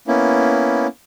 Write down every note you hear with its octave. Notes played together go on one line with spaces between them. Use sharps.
A#3 B3 C#4 E4